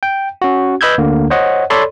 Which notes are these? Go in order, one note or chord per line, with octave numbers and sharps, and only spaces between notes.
G5
C#4 F#4
B4 D#5 B5 E6 G6 G#6
D2 D3 A#3
C5 C#5 D#5 F#5
A4 C#5 D5 B5 C6